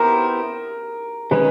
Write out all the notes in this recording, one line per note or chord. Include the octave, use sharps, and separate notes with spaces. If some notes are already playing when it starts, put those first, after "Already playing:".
Already playing: B3 E4 G4 A#4 C5
D#3 G#3 C#4 B4